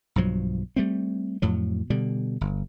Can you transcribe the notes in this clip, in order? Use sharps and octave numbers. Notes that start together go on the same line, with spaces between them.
B1 G2 F3 F#3
G3 A3 C4
F2 A2 F#3
B2 D3 G3
G1